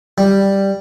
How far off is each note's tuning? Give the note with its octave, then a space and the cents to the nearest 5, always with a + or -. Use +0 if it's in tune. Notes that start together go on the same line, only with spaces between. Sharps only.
G3 +0